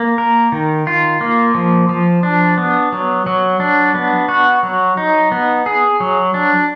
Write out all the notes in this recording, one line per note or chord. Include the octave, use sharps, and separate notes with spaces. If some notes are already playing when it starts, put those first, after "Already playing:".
Already playing: A#3
A#4
D#3
F4
A#3
F3
F3
D4
B3
F#3
F#3
D4
B3
F#4
F#3
D#4
B3
G#4
F#3
D4